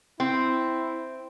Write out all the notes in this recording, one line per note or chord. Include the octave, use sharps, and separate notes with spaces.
C4 E4